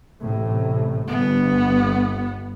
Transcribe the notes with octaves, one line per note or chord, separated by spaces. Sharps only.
A1 A2 C3
G1 B3